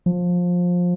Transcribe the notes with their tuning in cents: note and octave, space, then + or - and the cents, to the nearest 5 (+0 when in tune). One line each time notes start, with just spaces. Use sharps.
F3 +20